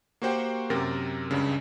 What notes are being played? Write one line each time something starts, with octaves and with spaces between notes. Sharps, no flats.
A#3 F#4 G4 C5 F#5 G5
F#2 C3 G4 A#4 A6
C#2 G2 C#3